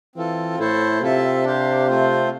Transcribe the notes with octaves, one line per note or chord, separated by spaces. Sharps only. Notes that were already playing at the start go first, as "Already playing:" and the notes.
E3 C4 F4 A4
A2 A3 E4 A4 C5
C3 C4 F4 A4 E5 A5
D4 G4 C5 F5
A3 C4 F4 C5